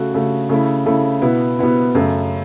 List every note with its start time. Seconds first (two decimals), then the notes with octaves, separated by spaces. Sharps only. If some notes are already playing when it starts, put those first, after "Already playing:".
Already playing: C#3 A3 F#4
0.14 C#3 A3 F#4
0.49 C#3 A3 E4
0.86 C#3 A3 E4
1.22 B2 B3 E4
1.59 B2 B3 E4
1.95 F#2 C#3 A3